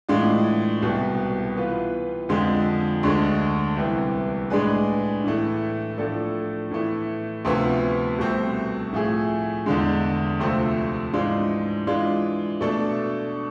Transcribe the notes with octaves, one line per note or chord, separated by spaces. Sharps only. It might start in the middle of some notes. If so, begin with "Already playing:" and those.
A2 E3 G#3 D4 F4
C2 B2 B3
E3 B3 F4 B4
F2 D3 F3 G#3
D2 D3 G#3
C2 C3 E3 B3 E4
A2 G#3 D4 G#4 B4
A2 E3 A3
A2 F3 A3 D4 A4
A2 E3 A3
D2 C3 F3 B3
C2 B2 A3 C4
A2 F3 A3 E4 G#4
E2 D3 G#3
D2 C3 F3 A3 C4
G#2 E3 G#3 D4 F4
E3 G#3 D4 F4
B2 A3 D4 A4